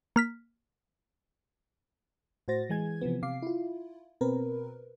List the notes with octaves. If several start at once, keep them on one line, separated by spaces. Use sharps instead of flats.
A#3 F6 B6
A2 F#4 C5 A6 A#6
E3 G#3 G#5 G#6
C3 E3 F3 B3
C3 F5 D6 C7
E4 F4
B2 C4 A#4 B4